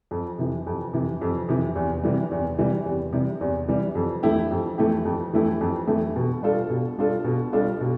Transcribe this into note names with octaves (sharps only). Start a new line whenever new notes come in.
F2
C3 E3
F2
C3 E3
F2
C3 E3
E2
C3 E3 G3
E2
C3 E3 G3
E2
C3 E3 G3
E2
C3 E3 G3
F2
E3 A3 E4 G4
F2
E3 A3 E4 G4
F2
E3 A3 E4 G4
F2
E3 A3 E4 G4
B2
G3 D4 F4 A4
B2
G3 D4 F4 A4
B2
G3 D4 F4 A4
B2